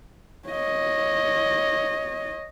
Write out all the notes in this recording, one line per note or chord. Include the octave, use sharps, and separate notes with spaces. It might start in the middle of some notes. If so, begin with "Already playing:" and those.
C#5 D#5